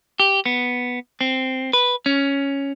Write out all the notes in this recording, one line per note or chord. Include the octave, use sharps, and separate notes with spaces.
G4
B3
C4
B4
C#4